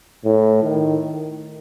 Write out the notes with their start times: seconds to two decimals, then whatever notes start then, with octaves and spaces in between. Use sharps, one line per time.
0.25 A2
0.63 D#3